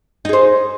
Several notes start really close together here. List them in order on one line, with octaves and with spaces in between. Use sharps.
D#4 G#4 C5